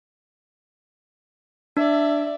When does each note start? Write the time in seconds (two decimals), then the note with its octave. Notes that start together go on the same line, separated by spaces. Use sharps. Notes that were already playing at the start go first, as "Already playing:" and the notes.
1.77 D4 D5 E5